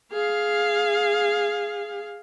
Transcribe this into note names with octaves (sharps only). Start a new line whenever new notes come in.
G#4 F5